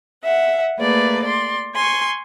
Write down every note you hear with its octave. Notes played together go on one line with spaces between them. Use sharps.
E5 F#5
A3 A#3 G#4 B4 D5
D5 C6
G#5 C6 C#6